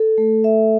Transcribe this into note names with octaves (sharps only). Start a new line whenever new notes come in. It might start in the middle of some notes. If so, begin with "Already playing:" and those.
Already playing: A4
A3
E5